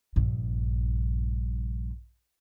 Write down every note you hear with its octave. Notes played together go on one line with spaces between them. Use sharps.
A#1 G2